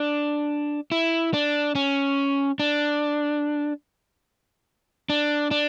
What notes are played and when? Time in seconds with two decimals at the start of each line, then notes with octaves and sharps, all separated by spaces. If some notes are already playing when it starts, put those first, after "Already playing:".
Already playing: D4
0.92 E4
1.34 D4
1.75 C#4
2.60 D4
5.10 D4
5.51 D4